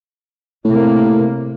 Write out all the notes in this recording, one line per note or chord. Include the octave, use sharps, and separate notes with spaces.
A2 C3 A#3